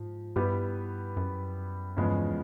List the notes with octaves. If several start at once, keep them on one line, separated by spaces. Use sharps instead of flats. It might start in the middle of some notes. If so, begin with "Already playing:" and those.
Already playing: G#2 F3
G2 G3 B3 E4 G4 B4
F#2
E2 G2 C#3 F3 G#3 B3